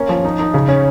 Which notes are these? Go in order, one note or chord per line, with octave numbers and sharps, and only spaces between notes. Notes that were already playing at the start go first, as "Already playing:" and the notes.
Already playing: A#3 C#4
F3
D#4
D#4
C#3
C#4